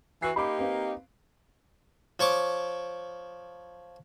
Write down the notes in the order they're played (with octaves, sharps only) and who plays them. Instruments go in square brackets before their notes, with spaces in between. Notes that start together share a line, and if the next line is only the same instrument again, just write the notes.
[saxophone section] E3 F#4 [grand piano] C7
[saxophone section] A#3 D#4 G4 [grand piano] B5 D6
[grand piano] C4 B4 F5
[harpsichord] F3 C#5 C#6 D6